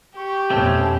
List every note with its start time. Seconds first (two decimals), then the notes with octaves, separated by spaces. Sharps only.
0.16 G4 C#6
0.50 F2 B2 A3 C4 C#4 A5